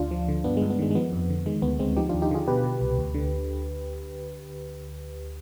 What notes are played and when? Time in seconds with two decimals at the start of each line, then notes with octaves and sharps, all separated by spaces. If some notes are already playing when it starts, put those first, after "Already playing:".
Already playing: D2 D4 F4
0.11 F3
0.28 D3
0.44 G2 B3 D4
0.57 G2 G#3
0.70 B3
0.79 D#3 G#3
0.91 G#3
0.95 F3 B3
1.13 F2
1.30 D3
1.46 D#3 G#3
1.62 D2 B3
1.79 D2 G#3 C4
1.97 F3 D#4 G4
2.09 D#2 D4 F4
2.22 D#4 G4
2.31 D3 F4 G#4
2.48 B2 G4 B4
2.64 B2
2.81 C2
2.98 D2
3.14 D3